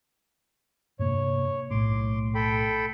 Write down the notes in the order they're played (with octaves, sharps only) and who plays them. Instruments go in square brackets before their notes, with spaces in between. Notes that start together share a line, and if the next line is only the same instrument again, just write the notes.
[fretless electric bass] G2 C3 A#3 [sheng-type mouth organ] C#5
[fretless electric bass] B1 A2 [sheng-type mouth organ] C6 D6
[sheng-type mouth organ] A4 G5 B5